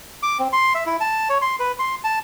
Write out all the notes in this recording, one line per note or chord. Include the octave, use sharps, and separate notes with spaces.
D6
C4
C6
E5
E4
A5
C#5
C6
B4
C6
A5